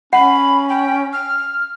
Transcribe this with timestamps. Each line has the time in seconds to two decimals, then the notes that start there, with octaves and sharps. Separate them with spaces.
0.13 C#4 F#5 B5
0.69 G5
1.13 F6